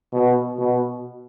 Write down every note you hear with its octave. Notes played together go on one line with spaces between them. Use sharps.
B2
B2